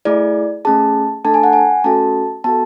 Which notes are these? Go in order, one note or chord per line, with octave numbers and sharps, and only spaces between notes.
A3 E4 G#4 D5
A3 C#4 G#4 A5
A3 D4 A4 A5
G#5
F#5
G#5
A3 C#4 F#4 A4 A5
B3 F#4 A4 A5